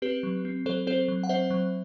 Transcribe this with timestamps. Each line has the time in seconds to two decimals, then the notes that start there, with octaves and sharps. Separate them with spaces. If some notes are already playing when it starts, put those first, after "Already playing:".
0.02 C4 G4 B4
0.23 F#3
0.45 C4
0.66 F#3 A4 C5
0.87 C4 A4 C5
1.08 F#3
1.23 F#5
1.29 C4 C5 E5
1.50 F#3